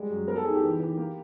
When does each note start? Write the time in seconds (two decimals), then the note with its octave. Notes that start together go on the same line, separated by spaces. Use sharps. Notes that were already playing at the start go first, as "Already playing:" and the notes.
Already playing: G3 G#3
0.10 F#2
0.27 B3 A#4
0.36 A4
0.45 D#4 G#4
0.55 G4
0.63 E3
0.80 E3
0.97 A#3